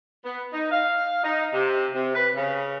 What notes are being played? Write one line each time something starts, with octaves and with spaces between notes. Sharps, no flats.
B3
D#4
F5
D#4
C3
C3
B4
C#3